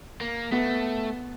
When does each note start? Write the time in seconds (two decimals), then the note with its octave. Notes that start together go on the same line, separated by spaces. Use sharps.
0.21 A#3
0.52 A3 B3